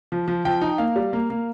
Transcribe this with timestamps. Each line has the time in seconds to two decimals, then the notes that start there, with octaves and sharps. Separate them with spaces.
0.12 F3
0.28 F3
0.45 F3 G5
0.62 D#4
0.78 A#3 F5
0.96 G3
1.13 A#3
1.30 A#3